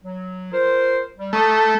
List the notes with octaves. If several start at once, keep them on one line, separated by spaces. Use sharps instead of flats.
F#3
F4 A#4 C5
G3
A3 A#5 C#6 D#6